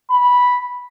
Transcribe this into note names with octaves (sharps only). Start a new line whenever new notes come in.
B5